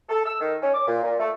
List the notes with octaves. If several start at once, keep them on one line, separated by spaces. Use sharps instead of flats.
A4
E6
D#3
C#4
D6
A#2
A#2
A3